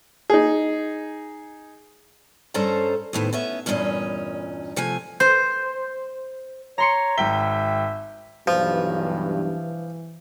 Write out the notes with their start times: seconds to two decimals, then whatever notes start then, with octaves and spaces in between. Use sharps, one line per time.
0.30 D#4 G#4
2.54 G2 C#4 A4 C5 A5 A#5
3.13 D#2 A2 B3 C5
3.33 B3 C#4 E5
3.66 E2 G2 A#2 C#4 D#5
4.76 C3 F3 A3 G#5
5.20 C5
6.78 C#5 A#5 C6 C#7
7.18 G#1 E5 G5 B6 G7
8.47 B1 G2 E3 F3